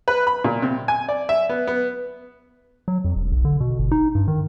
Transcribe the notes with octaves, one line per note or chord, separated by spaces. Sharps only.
B4
B5
A#2
C3
G#5
D5
E5
B3
B3
F#3
F2
E1
B1
D3
B2
G1
D#4
G2
D#3